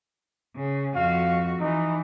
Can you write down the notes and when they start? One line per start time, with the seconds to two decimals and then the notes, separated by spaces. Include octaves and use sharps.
0.56 C#3
0.95 F2 F#4 F5
1.60 E3 D#4